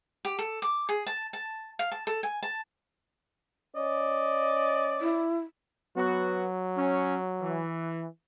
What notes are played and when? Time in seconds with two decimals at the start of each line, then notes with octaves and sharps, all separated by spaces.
0.25 G4
0.39 A4
0.62 D6
0.89 G#4
1.07 A5
1.33 A5
1.79 F5
1.92 A5
2.07 A4
2.23 G#5
2.43 A5
3.76 C#4 D5 D#5
5.01 E4
5.97 F#3 B3 F#4
6.77 C#4
7.42 E3